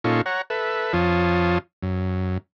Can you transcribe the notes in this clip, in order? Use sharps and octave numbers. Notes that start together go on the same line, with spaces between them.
A#2 C#4 D#4 F4 A4 C#6
C#5 F#5 A#5
A4 B4 E5
F2 F3 F4 C#5 A5 D#6
F#2